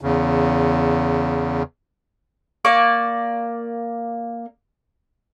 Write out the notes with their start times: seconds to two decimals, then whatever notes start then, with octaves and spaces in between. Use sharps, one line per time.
0.01 E2 C#3
2.65 A#3 D5 C#6